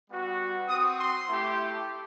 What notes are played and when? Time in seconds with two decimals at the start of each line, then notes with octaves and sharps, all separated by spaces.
0.10 G3 B3 F#4
0.68 C4 F#4 D#6
0.98 C6
1.27 A3 E4 G4